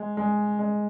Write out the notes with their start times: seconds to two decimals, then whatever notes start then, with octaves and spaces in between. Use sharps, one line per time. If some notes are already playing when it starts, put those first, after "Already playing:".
Already playing: G#3
0.17 G#3
0.59 G#3